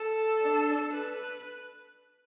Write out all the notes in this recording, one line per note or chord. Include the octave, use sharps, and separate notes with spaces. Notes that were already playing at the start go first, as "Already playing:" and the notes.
Already playing: A4
D4
B4